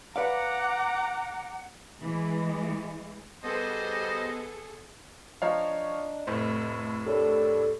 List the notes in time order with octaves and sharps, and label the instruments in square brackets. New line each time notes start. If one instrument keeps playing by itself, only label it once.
[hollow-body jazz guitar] B4 D5 F5 [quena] F#5 [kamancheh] A#5 D6
[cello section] E3 G#3
[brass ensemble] G3 C5 [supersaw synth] B3 [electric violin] G#4 A4 [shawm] D#5
[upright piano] F3 C#5 F5 [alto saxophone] D4 [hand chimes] D#5 A#5
[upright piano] F1 A2 C5 [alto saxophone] A3
[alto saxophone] D4 [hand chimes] G4 A#4 C#5 [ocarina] A4